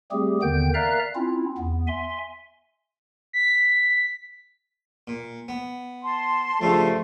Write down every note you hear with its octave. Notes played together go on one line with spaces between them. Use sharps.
G3 A3 C4 G4 G#4
D#2 D3 D#3 B3 G5 G6
A#4 D5 E5 F5 A#5 F#6
C4 C#4 E4 F4
E2 B3
E5 G#5 C6
B6
A#2
B3
A5 C6
G2 C#3 F3 G3 A3